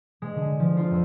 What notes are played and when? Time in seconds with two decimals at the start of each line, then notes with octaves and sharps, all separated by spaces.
0.22 G#3
0.35 D3
0.60 F3
0.77 F4
0.91 F2